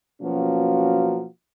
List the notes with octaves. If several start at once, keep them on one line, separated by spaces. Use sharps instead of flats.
B2 F3 F#3 A#3 C#4 F#4